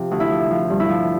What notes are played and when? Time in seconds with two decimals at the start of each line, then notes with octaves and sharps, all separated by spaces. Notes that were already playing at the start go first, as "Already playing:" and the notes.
Already playing: C3 F3 G4
0.11 D2
0.20 E4
0.31 F3
0.50 F3
0.70 G2
0.80 E4
0.89 F3